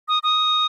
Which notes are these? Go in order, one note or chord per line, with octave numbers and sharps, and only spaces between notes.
D#6
D#6